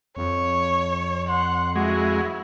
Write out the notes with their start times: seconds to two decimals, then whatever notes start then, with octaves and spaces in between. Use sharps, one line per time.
0.17 F2 C#5
1.29 F#5 C6
1.76 G#3 E4 F#4